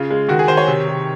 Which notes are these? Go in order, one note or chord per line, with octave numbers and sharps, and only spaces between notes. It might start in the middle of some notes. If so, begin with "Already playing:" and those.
Already playing: C#3 F4
G#3
D#3 F#4
G#4
D#3 C5
C#5
C3
C3